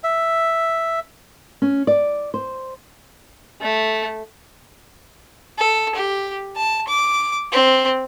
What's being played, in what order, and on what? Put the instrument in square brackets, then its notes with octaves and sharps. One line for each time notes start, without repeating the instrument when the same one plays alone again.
[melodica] E5
[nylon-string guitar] C#4
D5
C5
[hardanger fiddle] A3
[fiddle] A4
G4
A5
D6
C4